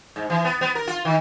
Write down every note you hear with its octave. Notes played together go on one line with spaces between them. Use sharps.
G#2
E3
B3
B3
A#4
F4
D#3